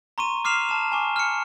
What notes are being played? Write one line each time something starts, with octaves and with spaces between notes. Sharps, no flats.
A#5 C6 C#6 D#7
D6 F6 C7 E7 F7
A5 E7
G#5 C#6 D6
F6 C#7